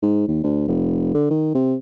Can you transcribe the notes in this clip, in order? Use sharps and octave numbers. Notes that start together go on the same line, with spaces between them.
G#2
D#2
D2
F1
D3
D#3
C3